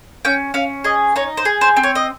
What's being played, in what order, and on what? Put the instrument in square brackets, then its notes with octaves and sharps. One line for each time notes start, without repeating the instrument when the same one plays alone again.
[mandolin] C#4 G5
C#4 F5
G#4 D#5
D#4 C#5
C5
G#4
C5
C4
C#5
D#5